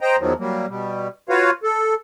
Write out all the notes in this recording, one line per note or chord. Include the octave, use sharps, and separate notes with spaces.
C5 D#5 G5 A#5
E2 D#3 F3 F#3
F#3 G3 A#3
B2 G3
F4 F#4 B4 C#5 F5
A4